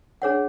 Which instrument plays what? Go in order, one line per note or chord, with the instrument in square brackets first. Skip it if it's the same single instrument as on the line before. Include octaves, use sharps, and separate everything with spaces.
[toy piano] D4 G#4 C#5 F#5